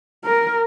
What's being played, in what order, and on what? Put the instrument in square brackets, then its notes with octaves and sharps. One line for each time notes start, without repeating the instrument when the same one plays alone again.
[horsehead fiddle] A#4